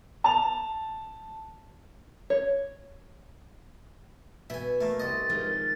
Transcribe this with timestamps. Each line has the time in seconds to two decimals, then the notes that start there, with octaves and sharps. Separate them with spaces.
0.24 A5 F7
2.30 C#5
4.50 B2 E5 G#5
4.81 A3 A#3
5.00 C2 D#5 A6
5.29 D#3 F3 G#3